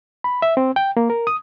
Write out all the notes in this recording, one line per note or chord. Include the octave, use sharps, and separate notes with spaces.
B5
E5
C4
G5
A#3
A#4
D#6